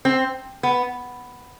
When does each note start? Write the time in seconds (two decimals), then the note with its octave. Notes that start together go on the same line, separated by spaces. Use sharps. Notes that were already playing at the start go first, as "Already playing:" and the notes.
0.05 C4
0.63 B3